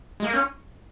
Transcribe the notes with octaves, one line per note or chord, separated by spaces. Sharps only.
G#3
A#3
C#4